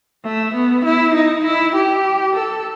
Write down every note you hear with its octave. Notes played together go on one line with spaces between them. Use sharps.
A3
B3
E4
D#4
E4
G4
A4